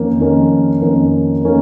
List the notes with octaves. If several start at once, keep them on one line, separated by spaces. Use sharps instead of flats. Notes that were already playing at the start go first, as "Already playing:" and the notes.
Already playing: F2 D#3 A#3 C#4
F2 D#3 A#3 C#4 A#4
F2 D#3 A#3 C#4 A#4
D#3 A#3 C#4 A#4